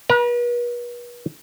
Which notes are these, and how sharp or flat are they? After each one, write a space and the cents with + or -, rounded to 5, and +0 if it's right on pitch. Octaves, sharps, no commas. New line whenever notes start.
B4 -40 A#5 +0